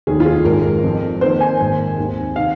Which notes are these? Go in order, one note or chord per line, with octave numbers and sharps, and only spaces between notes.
F1 D#2 D#3 G#4
F4
G#4
G#1 G#2 G#3 A#4
F2 F3 C4
F2 D#3 A#3 C5
G#5
G#1 G#2 D#3 A#3
D#2 D#3 G#3 C4
C3 D#3 F5